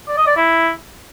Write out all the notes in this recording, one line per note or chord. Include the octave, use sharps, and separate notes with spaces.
D5
D#5
D5
E4